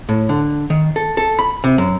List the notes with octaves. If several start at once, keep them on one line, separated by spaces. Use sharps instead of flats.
A2
D3
D#3
A4
A4
B5
C3
F#2